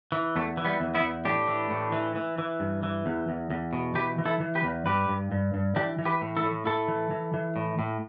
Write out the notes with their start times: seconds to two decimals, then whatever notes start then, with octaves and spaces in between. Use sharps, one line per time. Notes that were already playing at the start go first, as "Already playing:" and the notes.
0.12 E3
0.36 E2 A3
0.57 E3
0.65 G3 B3
0.80 E2
0.95 B3 E4
1.02 E2
1.25 A2 D4 G4
1.48 E3
1.70 A2
1.92 E3
2.16 E3
2.38 E3
2.60 G2
2.83 E3
3.06 E2
3.29 E2
3.50 E2
3.73 B2
3.95 E3 G4 B4
4.18 E3
4.25 E4 A4
4.40 E3
4.55 G4 B4
4.64 E2
4.86 G2 G4 B4
5.08 G2
5.32 G2
5.54 G2
5.76 E3 D4 G4
5.99 E3
6.05 G4 B4
6.21 A2
6.37 E4 A4
6.44 A2
6.66 A2 E4 A4
6.88 E3
7.11 E3
7.34 E3
7.56 A2
7.79 A2